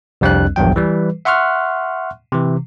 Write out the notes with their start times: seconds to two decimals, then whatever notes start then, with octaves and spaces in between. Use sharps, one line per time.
0.21 C2 F2 G3 C4 D4 F#6
0.56 A#1 E2 G2 F#3 G5
0.76 E3 G3 B4
1.25 E5 F#5 C6 C#6 F6 F#6
2.32 C3 E3